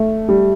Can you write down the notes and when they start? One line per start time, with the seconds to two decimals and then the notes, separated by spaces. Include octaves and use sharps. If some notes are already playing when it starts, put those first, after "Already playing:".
Already playing: A3
0.28 G3